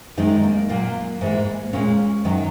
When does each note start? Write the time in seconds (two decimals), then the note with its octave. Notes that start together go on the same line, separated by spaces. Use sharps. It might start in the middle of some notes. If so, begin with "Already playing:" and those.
0.17 F#2 D#3 G#3 D#4
0.43 A#3
0.69 A#2 F#3 A#3
1.21 G#2 E3 G#3
1.73 A#2 G#3 C#4
2.25 F#2 D#3 F#3